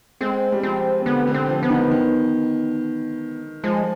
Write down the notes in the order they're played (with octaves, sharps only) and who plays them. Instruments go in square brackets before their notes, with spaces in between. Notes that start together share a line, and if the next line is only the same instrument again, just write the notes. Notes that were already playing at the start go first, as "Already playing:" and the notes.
[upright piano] G#3 [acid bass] C4
[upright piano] G3
[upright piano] F3 [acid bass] C4
[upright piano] D3 [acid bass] B3
[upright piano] D3
[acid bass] C4
[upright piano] F3
[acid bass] B3
[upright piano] D#3
D#3
[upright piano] F3 [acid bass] G#3